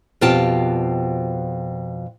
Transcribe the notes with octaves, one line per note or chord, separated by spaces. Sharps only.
F2 B2 C4 F4 G4 A5